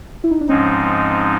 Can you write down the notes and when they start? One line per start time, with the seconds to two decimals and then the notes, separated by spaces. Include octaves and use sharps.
0.24 E4
0.31 D#4
0.41 D4
0.49 G#2 F3 G#3 C4 C#4 D#4